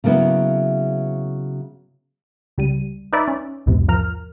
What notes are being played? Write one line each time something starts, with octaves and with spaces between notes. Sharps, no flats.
C#3 F#3 A#3 B3 E4
C#2 G3 D#7
D#4 B4 D5 E5
C#4
B1 E2 G#2 C3
F3 A#4 F6